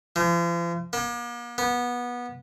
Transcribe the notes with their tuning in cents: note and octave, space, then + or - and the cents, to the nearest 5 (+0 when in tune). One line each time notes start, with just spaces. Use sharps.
F3 -40
A#3 +45
B3 -20